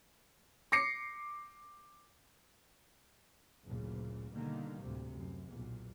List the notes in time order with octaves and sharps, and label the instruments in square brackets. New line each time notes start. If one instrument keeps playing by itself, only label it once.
[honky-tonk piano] D6 A#6 C7 C#7
[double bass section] F#1 D2 A#2 C#3
B2 D3 D#3 G3 A#3
D2 A2 C3
F#2
B1 E2 A#2